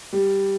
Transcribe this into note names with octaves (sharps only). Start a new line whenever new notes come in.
G3